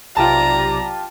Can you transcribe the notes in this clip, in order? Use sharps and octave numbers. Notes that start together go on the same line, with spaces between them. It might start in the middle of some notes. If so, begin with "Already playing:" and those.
B1 C3 F4 G4 D5 A5 A#5